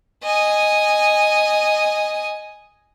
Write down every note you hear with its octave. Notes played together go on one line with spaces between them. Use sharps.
D#5 G#5